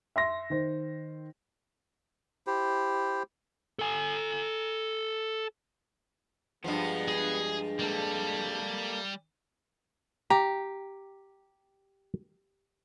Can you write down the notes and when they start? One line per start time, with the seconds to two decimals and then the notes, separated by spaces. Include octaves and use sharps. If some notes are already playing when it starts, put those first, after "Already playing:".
0.16 E5 C6 A#6
0.50 D#3 C5
2.47 E4 G4 C5
3.79 A4 G#5
6.64 G2 F3 G#3 B3
7.08 G#4
7.79 G3 A#3 A4
10.30 G4 A#5